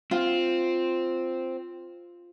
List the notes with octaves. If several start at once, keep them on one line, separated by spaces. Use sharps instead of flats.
C4 F4